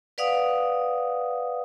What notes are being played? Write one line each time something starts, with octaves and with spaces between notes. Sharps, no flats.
B4 D5 F5 F#5 D#6